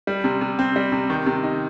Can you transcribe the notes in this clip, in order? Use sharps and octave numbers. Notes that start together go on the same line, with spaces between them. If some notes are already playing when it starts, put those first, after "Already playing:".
G3
C3
C3
C4
G3
C3
D#3
C3
D#4